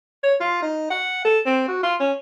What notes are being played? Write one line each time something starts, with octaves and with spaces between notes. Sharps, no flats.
C#5
F4
D#4
F#5
A4
C4
F#4
F4
C#4